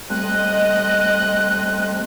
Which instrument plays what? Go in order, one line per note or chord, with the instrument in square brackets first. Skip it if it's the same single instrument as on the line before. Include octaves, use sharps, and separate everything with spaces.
[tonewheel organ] G3 A3 C4 [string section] D#5 [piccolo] F#6